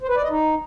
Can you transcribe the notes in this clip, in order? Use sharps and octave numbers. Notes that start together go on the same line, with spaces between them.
C5
B4
D5
D#5
D#4